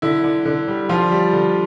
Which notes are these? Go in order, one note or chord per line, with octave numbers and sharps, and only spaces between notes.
D3 E4
D3
D3
G3
F3 G3 F4
G3
D3